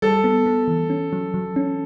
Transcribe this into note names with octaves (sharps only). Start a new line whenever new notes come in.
G3 A4
B3
B3
E3
C#4
F#3
F#3
C#4